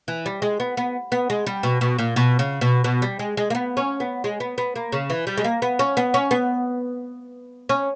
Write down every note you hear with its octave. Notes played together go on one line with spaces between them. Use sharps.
E3
G3
G#3
B3
B3
B3
G#3
G3
B2
B2
A#2
B2
C#3
B2
B2
G3
G#3
G#3
A#3
B3
C#4
B3
G#3
B3
B3
A#3
C#3
E3
G3
G#3
A#3
B3
C#4
B3
C#4
B3
C#4